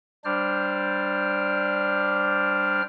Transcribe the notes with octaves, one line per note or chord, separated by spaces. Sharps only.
G3 D4 C5 D5 F6